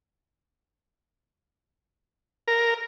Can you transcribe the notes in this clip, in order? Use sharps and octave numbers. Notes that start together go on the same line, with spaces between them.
A#4